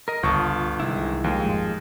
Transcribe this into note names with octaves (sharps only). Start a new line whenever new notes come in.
A#4 D#5
G1 C#2 C#3 F4 A5 C#6 D#6
C2 D#3 G#3 E4
D#2 F3 G#3
G#1 F2